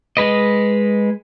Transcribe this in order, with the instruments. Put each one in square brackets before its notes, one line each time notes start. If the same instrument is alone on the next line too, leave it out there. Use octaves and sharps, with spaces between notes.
[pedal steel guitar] G#3 B4 D#5